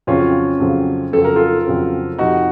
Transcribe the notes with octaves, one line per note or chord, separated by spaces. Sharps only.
F2 C#3 F#3 C4 C#4 F4
F2 C#3 F#3 C4
F2 C#3 F#3 C4 A4
A#4
F4 A4
F2 C#3 F#3 C4
F2 C3 F3 C4 D#4 F4 F#4